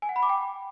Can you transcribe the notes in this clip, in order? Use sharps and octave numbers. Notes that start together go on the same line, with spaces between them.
G#5
F#5
B5
D6
G5